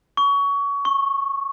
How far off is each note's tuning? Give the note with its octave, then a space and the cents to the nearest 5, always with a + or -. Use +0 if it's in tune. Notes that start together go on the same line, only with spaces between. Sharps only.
C#6 +25
C#6 -15